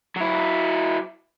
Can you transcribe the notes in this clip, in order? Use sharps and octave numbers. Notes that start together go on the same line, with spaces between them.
F#3 E4